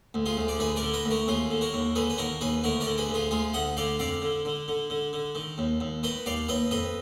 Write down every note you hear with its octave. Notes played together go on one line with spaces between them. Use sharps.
D2
F4 G#4
D2
D5
D2 G#4 B4
A#4 D5
D3
B4 D#5
D2
F#4 A#4
D#2 F4 G#4
D3
F#4 A#4
D#2
D3 G#4 B4
B4
D#2 F#4 A#4
D#2 G#4 B4
D2 F#4 A#4
A#4 D5
D3
G#4 B4
D2
F4 G#4
D2 F4 G#4
D2 D#5 F#5
D3 D5 F5
F2 D5 F5
D3
D3
D3
D3
D3
D#3
D#2
D#2
D#3 B4 D#5
D#2 D5 F5
D#2 B4 D#5
F2 B4 D#5